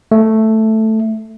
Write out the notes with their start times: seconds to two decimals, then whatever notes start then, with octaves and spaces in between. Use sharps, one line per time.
0.12 A3